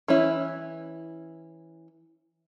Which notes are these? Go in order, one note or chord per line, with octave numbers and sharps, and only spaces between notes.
E3 C#4 E4